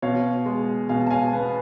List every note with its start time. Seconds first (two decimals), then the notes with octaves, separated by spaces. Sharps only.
0.02 B2 C#5 F5
0.46 G#3
0.89 B2 F5 G#5
1.07 A5
1.11 F5 G#5
1.33 B3